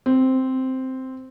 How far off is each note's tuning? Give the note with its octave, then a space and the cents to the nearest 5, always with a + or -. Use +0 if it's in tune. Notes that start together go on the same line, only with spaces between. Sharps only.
C4 -5